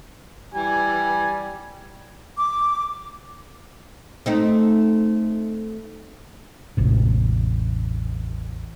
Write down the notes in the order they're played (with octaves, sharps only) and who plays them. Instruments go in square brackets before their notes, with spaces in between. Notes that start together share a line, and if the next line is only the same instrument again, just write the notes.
[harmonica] E3 G#5 [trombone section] G3
[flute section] D6
[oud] A3 C4 D#4
[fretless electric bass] E1 A1 C3